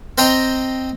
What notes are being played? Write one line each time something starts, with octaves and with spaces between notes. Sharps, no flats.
C4 C5 D#5 G5 A#5